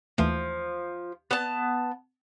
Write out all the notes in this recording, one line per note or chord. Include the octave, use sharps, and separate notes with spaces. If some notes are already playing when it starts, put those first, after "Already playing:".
D#2 E3 F3 A3
B3 A5